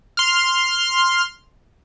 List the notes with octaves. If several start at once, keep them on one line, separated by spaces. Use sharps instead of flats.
C6 F6